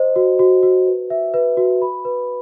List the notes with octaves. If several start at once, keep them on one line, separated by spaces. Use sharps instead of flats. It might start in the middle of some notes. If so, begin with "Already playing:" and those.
Already playing: C5 D#5
F#4
F#4
F#4
B4
E5
B4
F#4
B5
B4